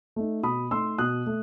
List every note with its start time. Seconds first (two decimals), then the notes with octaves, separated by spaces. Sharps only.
0.16 A3 D#4
0.43 B2 B5 D#6
0.71 A3 D#4 C6 E6
0.98 B2 D#6 F#6
1.27 A3